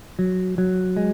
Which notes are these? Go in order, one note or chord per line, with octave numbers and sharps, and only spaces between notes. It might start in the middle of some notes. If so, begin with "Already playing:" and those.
F#3
F#3
G#3